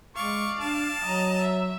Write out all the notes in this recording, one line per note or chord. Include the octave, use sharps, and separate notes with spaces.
G#3 D5 F5 C#6
D4 A5
F#3 D#5 A#5
E5